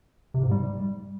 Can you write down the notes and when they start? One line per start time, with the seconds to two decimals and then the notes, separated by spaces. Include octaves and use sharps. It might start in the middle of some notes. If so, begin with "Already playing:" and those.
0.34 C3
0.43 G#2
0.51 G3